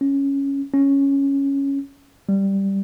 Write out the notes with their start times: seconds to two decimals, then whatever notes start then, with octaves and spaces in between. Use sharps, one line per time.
0.01 C#4
0.74 C#4
2.29 G3